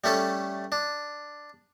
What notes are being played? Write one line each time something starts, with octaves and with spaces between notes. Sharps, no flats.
G3 A3 C#4 A4
D4